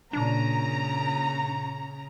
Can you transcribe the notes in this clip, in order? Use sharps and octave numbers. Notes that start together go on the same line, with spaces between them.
A#2 C#3 D4 A#5